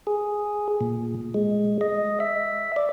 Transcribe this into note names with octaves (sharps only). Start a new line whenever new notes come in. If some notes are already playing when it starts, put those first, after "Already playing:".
G#4
A#2
G#3
D#5
E5
D5